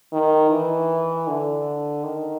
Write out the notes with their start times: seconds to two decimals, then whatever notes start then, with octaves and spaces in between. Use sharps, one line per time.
0.13 D#3
0.51 E3
1.28 D3
2.04 D#3